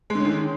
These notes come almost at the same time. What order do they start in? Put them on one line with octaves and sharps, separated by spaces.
G#3 D3 C#4 D#3